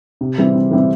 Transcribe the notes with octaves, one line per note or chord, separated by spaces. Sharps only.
C3
E3 G3 C4
C3
E3 G3 C4